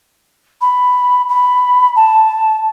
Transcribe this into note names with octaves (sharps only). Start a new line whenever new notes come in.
B5
B5
A5